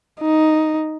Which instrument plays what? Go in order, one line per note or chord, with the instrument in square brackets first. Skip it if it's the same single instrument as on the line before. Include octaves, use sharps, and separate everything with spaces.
[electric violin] D#4